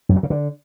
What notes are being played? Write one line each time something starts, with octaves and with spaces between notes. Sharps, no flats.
F#2
F#3
C#3
D3